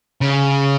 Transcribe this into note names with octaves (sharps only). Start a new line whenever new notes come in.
C#3